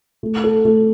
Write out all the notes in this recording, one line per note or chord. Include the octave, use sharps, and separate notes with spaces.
A3
A4
A3